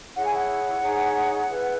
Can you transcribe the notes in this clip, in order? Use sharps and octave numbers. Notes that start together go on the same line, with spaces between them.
E4 G#4 C#5 F#5
G#5
F#5
D#4 G#4 C#5
E4 G#4 B4